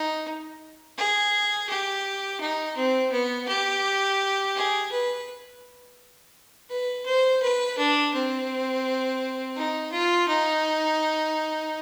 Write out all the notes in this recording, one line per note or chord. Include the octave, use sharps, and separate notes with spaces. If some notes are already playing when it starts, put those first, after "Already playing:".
Already playing: D#4
G#4
G4
D#4
C4
B3
G4
G#4
B4
B4
C5
B4
D4
C4
D#4
F4
D#4